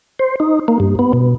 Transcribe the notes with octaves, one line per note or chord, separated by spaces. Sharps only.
C5
D#4
A#3
G2
B3
B2